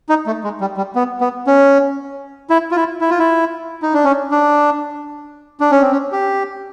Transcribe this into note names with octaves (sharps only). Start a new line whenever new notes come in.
D#4
A3
G#3
G3
G3
B3
B3
C#4
E4
F4
E4
E4
F4
E4
D#4
D4
C#4
D4
D4
C#4
C4
C#4
G4